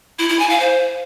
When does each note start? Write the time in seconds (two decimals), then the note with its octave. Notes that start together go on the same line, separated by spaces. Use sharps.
0.19 E4
0.29 E4
0.39 G#5
0.50 F5
0.60 C5